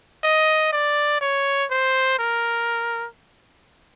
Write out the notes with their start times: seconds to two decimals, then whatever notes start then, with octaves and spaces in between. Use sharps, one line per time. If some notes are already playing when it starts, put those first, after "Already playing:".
0.24 D#5
0.73 D5
1.21 C#5
1.71 C5
2.19 A#4